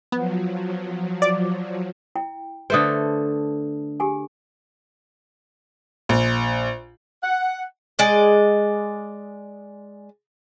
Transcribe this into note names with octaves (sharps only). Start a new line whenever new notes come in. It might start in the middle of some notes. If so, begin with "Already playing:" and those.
F3 F#3 B3
D5
E4 G5
D3 A3 B4 C5 D#6
G4 G#4 G#5
A#1
F#5
G#3 D5 D#5